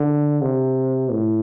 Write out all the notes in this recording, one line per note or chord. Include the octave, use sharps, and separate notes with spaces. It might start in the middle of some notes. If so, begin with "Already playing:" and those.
Already playing: D3
C3
A2